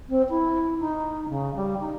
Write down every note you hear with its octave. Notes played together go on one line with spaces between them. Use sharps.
C4
E4
D#4
C#3
G3
D#4